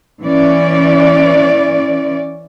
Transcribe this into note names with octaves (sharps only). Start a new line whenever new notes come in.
E3 C#4 D5